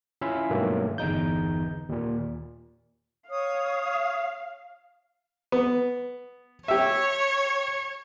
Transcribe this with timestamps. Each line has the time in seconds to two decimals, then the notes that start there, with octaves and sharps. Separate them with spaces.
0.21 C#4 E4 F4 E5 F5
0.50 G2 B2 D#3 F#3 A3 A#3
0.98 G1 E2 D#4 G6
1.89 D#2 A#2
3.30 C#5 F5 D#6
5.52 B3
6.68 G4 C#5 E5